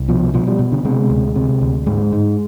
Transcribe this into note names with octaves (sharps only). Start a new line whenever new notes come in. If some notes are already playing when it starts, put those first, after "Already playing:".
Already playing: C2
B2 F3
B2 F3
G3
B2
D3
C3 G#3
D2
C3
D2
G#2 G#3
G#2